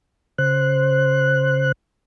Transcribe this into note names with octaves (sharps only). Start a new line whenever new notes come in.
C#3 C5 F#6